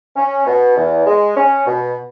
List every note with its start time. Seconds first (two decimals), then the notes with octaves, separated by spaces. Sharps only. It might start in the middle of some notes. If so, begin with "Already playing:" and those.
0.17 C#4
0.47 B2
0.77 E2
1.07 G#3
1.37 C#4
1.67 B2